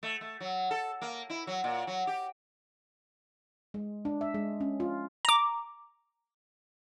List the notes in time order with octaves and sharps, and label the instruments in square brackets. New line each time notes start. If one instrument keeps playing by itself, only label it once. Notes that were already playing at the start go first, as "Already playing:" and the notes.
[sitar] A3
A3
F#3
A4
A#3
E4
F#3
A#2
F#3
G4
[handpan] G#3
D4
E5
G#3
C#4
F4
[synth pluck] A#5 D6